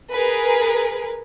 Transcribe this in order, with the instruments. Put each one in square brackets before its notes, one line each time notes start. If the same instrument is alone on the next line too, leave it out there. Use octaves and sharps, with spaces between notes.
[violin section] G#4 A#4 B4